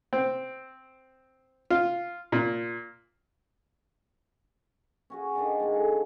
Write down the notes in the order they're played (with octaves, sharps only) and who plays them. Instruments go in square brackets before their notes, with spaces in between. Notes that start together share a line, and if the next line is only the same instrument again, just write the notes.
[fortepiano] C4
F4
A#2
[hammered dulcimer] C#4 F#4 G#4
D#3 D4 D#5
C#3 G#3
A4